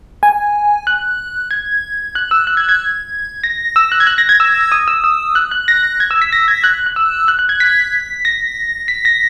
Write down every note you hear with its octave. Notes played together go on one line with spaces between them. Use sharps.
G#5
F#6
G#6
F#6
E6
F#6
G#6
G#6
A#6
E6
F#6
G#6
F#6
A#6
G#6
E6
D#6
E6
E6
F#6
F#6
A#6
G#6
E6
B6
A#6
G#6
F#6
F#6
E6
F#6
F#6
G#6
B6
A#6
B6
A#6